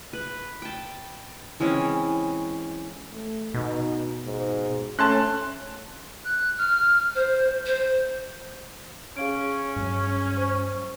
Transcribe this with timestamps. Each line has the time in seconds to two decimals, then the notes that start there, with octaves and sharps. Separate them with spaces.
0.13 B4
0.62 G5 A5
1.60 E3 G#3 C4 C#4
3.13 A3
3.54 B2 D#4
4.24 G#2
4.99 A3 C#4 A5 C6 F#6
6.25 F#6
6.58 F6
7.15 C5
7.66 C5
9.17 C#4 G#4 F5 D7
9.76 G2 F#3 G#3
10.37 C5 C#6